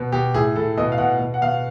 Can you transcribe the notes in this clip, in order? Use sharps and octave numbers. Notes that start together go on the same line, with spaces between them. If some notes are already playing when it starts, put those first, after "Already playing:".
Already playing: B2
B2 G4
A2 G#4
A2 A4
B2 D#5
F5
B2 F#5
B2
F#5
B2 F5